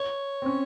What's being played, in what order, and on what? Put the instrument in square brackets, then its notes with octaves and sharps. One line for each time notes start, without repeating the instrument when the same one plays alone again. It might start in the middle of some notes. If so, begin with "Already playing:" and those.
Already playing: [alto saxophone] C#5
[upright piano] C4
C#4